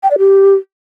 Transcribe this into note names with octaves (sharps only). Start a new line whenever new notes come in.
G5
D5
G4